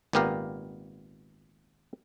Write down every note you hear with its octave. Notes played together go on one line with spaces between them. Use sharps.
G#1 A#2 B3 G4 A#4 F5